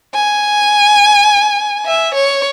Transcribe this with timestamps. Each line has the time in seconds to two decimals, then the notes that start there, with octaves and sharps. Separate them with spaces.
0.14 G#5
1.86 E5
2.15 C#5